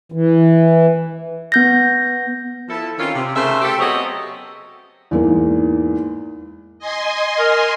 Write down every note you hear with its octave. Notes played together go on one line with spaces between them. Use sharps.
E3
B3 G6 A#6
F3 E4 A4
D#3 C4 C#4 F4
C3
C#3 A3 A#4 C5 E5
G4 A4
F#3 B3 C4 G#4 C#5 D#5
E2 G#2 A#3
D#5 G#5 C6
A#4